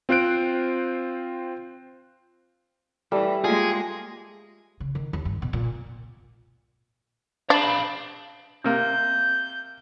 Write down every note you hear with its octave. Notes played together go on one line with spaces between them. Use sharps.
C4 F4 C5 F#6 D7
E3 G3 A3 E6
G#3 A#3 F4 G#4
C#3
D#3
D#2
G2
B2
A#2
D4 F5 B5
C3 A#3 G6